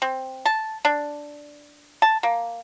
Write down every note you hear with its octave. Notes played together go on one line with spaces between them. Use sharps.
C4
A5
D4
A5
A#3